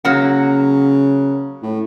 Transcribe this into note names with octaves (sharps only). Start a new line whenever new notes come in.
C#3 F#3 A#3 F#5
A2